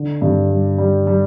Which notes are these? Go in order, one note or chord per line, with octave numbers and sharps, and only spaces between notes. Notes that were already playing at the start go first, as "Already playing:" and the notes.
Already playing: D3
G2
G3
G3
G3